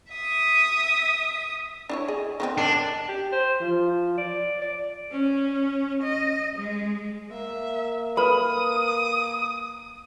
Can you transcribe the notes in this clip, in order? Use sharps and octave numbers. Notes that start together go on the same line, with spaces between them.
E5 D#6
D4 E4 C#5
G#4 D#5
D#3 B3 C4
D4 A#4 D#5
G4
C5
F3
D5
D5
C#4
D#5
G#3
A#3 E5
A4 B4 B5 D#6